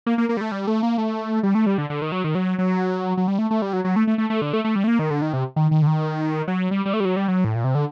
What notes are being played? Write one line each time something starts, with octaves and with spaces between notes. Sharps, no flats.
A#3
A#3
A#3
G3
A3
G3
A3
A#3
A3
G3
A3
G3
D3
D3
D#3
F#3
D#3
F#3
F#3
F#3
G3
A3
A3
G3
F#3
F#3
A3
A3
A3
A3
D3
A3
A3
G3
A3
A#3
D#3
D3
D#3
C3
D#3
D#3
D3
D#3
F#3
G3
G3
A3
G3
F#3
G3
F#3
A2
A#2
C3
D3